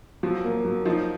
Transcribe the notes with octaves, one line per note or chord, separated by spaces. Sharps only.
F3 F#3
A#3
F#3
F3 D#4